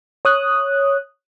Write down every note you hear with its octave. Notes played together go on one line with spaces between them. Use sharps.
C#5 D#6 F#6